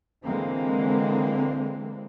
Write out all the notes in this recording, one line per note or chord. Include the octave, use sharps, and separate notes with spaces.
D3 E3 G#3 A#3 C4